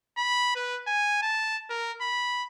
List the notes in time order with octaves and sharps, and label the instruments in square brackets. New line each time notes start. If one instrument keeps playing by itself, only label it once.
[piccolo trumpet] B5
B4
G#5
A5
A#4
B5